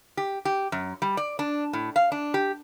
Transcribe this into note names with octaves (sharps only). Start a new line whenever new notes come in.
G4
G4
F#2
G3
D5
D4
A2
F5
D4
G4